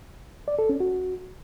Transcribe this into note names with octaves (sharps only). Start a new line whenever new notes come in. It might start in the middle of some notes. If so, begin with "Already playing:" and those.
D5
A4
C#4
F#4